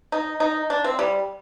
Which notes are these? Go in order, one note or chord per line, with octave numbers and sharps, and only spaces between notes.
D#4
D#4
D4
C4
G3